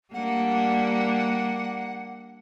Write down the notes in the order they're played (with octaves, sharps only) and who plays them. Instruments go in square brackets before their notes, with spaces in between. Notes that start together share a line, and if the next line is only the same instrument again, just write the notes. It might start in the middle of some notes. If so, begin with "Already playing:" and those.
[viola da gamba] G3 A#3 D4 [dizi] F#5